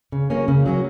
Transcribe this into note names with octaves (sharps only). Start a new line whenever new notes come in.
C#3
F#3 A#3 C#4
C#3
F#3 A#3 C#4